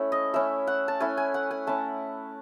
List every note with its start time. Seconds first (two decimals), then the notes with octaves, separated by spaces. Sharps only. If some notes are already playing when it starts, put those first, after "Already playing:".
Already playing: A3 C#4 E4
0.12 D#5
0.34 A3 C#4 E4 E5
0.67 F#5
0.88 A5
1.00 A3 C#4 E4 G#5
1.17 G#5
1.34 F#5
1.51 G#5
1.67 A3 C#4 E4 A5